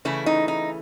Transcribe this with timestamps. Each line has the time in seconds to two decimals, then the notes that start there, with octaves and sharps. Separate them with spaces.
0.05 C#3 E3 A3 E4
0.26 D#4
0.48 D#4